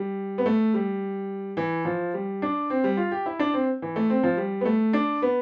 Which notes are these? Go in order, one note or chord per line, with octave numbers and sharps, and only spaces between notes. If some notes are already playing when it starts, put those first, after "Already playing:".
Already playing: G3
B3
A3
G3
E3
F3
G3
D4
C4
G3
F4
G4
E4
D4
C4
E3
A3
C4
F3
G3
B3
A3
D4
B3